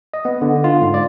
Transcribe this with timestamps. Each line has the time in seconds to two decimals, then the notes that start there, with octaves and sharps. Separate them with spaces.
0.14 D#5
0.25 B3
0.42 D3
0.64 F4
0.82 G#2
0.94 D5